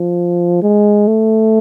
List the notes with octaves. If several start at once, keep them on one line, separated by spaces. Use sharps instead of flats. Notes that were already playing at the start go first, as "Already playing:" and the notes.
Already playing: F3
G#3
A3